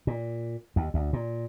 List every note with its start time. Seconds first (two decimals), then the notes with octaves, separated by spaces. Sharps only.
0.07 A#2
0.76 D#2
0.94 D2
1.13 A#2